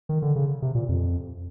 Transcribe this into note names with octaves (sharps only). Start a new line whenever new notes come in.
D#3
D3
C#3
C3
A#2
F2